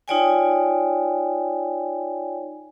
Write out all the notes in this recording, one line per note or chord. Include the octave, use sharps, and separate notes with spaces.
D#4 F4 C#5 D5 G5 G#5